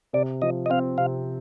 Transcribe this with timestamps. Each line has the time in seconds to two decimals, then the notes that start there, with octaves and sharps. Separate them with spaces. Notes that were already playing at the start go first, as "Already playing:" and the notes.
0.13 C3 D5
0.42 F3 D#5
0.66 D#5
0.70 C4 F5
0.98 C3 F5